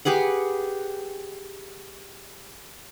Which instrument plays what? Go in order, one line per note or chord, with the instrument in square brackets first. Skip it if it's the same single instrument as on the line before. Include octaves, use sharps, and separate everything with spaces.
[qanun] G4 G#4 B4 F#5